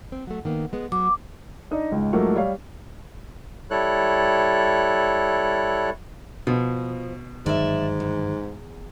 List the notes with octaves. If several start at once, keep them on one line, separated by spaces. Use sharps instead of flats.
C4
F#3 A3
D#3 A#3 B3
G#3 B3
F#3 D6
D4 D#4 D#5
C#2 G#2
G#2 F3 F#3 A3 A#3
G3 C#5 F5
G3 E4 A4 C#5 F#6
B2 F3
G1 G#2 D#3 F#3 D5 E5
E2